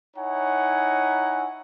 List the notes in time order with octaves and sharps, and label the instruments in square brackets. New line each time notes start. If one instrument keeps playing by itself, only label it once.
[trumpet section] D#4 E4 C#5 F#5 G#5 A#5